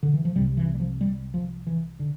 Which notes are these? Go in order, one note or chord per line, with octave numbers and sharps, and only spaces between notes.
D3
E3
F3
C2 C3 G3
E3
G3
F3
G3
F3
E3
D3